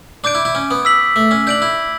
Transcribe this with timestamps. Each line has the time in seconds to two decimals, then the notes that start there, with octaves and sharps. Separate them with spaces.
0.24 D4 D6 G6 D7
0.35 E4
0.45 E4
0.55 C#4
0.71 B3
0.85 E6 B6 F#7
1.16 A3
1.31 C#4
1.47 D4 G6 D7 F#7
1.62 E4